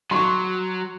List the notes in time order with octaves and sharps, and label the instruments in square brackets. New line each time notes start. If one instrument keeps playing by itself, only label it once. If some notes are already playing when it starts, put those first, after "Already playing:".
[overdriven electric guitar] F#3 [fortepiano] C6 C#6